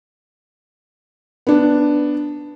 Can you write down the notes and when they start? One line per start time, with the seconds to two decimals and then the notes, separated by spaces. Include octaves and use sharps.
1.47 B3 D4